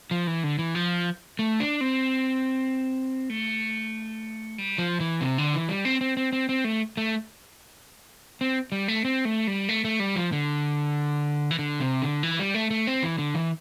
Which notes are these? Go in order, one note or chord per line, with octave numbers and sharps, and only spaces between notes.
F3
E3
D3
E3
F3
A3
D4
C4
A3
G3
F3
E3
C3
D3
E3
G3
C4
C4
C4
C4
C4
A3
A3
C4
G3
A3
C4
A3
G3
A3
A3
G3
F3
D3
E3
D3
C3
D3
E3
G3
A3
A3
C4
E3
D3
E3